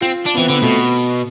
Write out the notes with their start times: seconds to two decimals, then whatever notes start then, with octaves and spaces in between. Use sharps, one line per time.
0.01 C4 F4
0.26 D4
0.34 B3
0.37 E3 C4
0.49 D3 B3
0.62 B2 A3